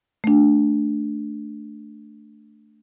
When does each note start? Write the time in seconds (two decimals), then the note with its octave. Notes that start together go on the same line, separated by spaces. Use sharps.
0.24 A3 D4